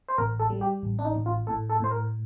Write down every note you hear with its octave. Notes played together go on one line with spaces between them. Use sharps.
C5
A1 A#4
A4
G3
G4
A1
D4
D#4
A1
F4
A2 A4
A4
A2 C5
A#4